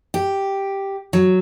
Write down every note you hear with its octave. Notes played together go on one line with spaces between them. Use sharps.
G4
F#3